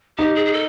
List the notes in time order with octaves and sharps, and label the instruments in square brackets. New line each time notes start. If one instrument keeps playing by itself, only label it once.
[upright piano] D#4 [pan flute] G4
[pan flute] G#4
G#4
A4